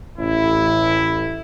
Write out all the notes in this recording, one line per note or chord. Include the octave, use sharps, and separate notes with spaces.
A1 E4